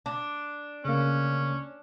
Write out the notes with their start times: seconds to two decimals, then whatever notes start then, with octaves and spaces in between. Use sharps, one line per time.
0.06 D4
0.85 C#3 A#3 C#4